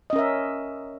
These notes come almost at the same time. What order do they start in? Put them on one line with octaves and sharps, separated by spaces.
D#5 C#4 A#4 E5